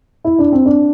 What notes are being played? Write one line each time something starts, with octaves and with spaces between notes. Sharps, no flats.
E4
D4
C4
D4